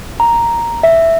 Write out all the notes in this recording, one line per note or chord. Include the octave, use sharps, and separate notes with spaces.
A#5
E5